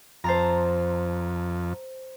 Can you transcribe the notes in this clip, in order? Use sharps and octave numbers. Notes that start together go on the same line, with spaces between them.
F2 C5 A5 A#5